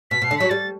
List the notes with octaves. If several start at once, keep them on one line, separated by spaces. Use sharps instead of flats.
B2 B6
B2 C7
D3
F#3 B6
G3 A6